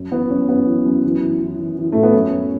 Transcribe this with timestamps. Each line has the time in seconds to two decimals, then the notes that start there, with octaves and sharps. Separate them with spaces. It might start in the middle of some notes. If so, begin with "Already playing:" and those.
Already playing: F#2
0.12 E3 B3
0.30 F#2 C#4
0.49 F#2 B3
0.67 E3
0.86 F#2
1.03 E3
1.22 E3
1.40 E3
1.58 E3
1.77 E3
1.92 A2 A3
2.03 B3
2.13 F#2 C#4
2.32 F#2